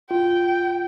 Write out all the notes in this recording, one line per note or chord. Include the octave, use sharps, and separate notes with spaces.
F4 G5